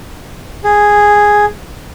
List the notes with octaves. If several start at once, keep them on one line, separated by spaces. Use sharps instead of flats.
G#4